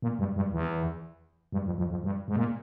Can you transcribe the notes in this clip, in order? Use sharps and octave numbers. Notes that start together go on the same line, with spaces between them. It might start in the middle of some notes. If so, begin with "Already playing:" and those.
A#2
G2
G2
E2
G2
F2
F2
F2
G2
G#2
A#2